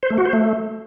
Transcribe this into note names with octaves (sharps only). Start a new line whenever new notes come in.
C5
A3
F#4
C5
A3